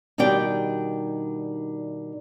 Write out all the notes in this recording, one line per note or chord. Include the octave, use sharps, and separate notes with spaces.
B2 D#3 G3 D4 D5 G5